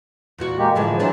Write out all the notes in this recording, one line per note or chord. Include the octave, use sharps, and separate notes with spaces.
E2 A#2 F#4
G#3 A#3 G4
A2 D3 E3 F3 G#3
E3 F#3 G#3 D4 C5